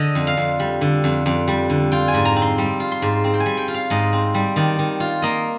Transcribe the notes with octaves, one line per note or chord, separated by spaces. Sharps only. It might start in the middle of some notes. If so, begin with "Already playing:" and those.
Already playing: D3 D#5
F2
F5
F2
G3
D3
F2
F2
G3
D3
F4 G5
G#5
G#2
A#5
C4
C6
G3
F4
C6
G#2
C4
G5
G#5
G3
G5
F4
F5
G#2 D#5
C4
G3
D#3 D5
D#3
F4
A#3 D#5